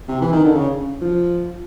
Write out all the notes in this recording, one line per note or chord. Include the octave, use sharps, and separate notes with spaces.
C3
E3
D#3
D3
C#3
F3